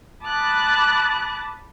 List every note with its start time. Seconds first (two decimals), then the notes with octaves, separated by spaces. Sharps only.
0.23 A5 B5 D6 D#6 F#6 A6